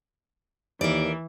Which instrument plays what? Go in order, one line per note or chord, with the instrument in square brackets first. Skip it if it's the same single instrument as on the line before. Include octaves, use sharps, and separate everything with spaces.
[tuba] D#2 [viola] E3 [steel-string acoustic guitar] A#4 D5